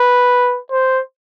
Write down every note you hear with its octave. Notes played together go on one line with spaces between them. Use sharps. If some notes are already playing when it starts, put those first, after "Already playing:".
Already playing: B4
C5